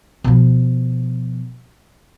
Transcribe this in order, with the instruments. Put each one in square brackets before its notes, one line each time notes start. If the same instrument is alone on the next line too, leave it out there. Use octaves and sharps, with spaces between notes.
[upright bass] B2 F3